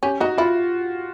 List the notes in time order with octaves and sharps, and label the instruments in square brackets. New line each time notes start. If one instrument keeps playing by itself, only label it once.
[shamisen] C#4 [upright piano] G4
[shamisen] D#4 [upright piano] F#4
[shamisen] E4 [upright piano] F4